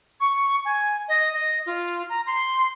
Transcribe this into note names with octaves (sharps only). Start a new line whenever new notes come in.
C#6
G#5
D#5
D#5
F4
A#5
C6